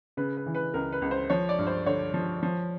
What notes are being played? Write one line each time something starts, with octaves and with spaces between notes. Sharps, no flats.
C#3 B4
B4
E3
B4
C#2 A#4
B4
C#2
C5
F3 C#5
D5
G2
C5
D3 C#5
F3
F3